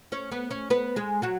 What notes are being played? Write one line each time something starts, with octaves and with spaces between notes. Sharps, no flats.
C#4 C#5
B3 B4
C#4 C#5
B3 B4
G#3 G#4
F#3 F#4